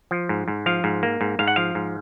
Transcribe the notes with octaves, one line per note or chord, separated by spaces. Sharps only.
F3
G#2
G#2
F3 F5
G#2
A#3
G#2
G#2 F5
F#5
F3 F5
G#2